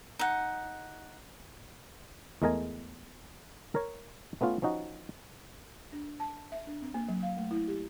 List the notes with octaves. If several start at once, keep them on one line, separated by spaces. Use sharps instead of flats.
D#4 F#5
E2 G#3 A3 A#4 D#5 G#5
A#4 C#5
A3 B3 C#4 F4
F3 C#4 D#4 F#4
D4
A5
E5
D4
C4
A#3
F#3
F5
A3
E4
G4